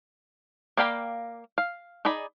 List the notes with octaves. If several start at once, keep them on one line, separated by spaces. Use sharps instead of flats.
A#3 D5 F5 G5 B5
F5
D#4 G#4 D5 B5